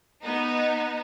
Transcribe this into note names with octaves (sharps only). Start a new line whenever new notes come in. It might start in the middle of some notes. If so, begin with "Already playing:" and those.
B3 D#4